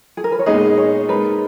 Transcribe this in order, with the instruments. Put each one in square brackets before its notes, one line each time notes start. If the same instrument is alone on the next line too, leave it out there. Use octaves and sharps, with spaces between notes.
[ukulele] G#4
A#4
B4
C#5
[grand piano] A#2 G#3 B3 D#4 G#4 [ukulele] D#5
[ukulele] C#5
[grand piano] G#3 D#4 A#4 [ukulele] B4